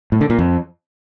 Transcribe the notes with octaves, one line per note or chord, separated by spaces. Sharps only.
A2
D3
A#2
F2